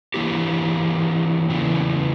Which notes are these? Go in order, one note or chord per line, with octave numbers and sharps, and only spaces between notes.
E3 A#3 E4 G4
E2 C#3 E3